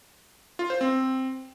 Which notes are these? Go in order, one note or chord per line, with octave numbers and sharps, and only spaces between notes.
F4
C5
C4